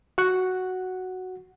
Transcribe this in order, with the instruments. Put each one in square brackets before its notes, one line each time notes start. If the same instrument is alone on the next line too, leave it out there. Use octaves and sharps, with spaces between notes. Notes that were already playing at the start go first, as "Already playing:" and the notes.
[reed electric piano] F#4 F#5